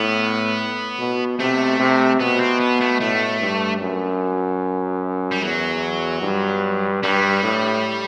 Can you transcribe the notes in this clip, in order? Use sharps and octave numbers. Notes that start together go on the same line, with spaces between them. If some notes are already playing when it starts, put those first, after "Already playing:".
Already playing: A2 B3
B2
C3 A3
C3
B2 B3
C4
B3
A3
A2 A3
G2
F#2
G3
E2 F#3
G2
G2 G3
A2